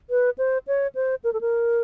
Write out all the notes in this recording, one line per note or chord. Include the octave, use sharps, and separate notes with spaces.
B4
C5
C#5
C5
A#4
A4
A#4